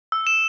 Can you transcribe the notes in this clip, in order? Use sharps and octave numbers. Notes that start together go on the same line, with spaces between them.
E6
E7